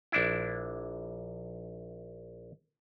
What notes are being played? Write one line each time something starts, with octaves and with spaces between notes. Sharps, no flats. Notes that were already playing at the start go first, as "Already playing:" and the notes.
A#1 D4 E4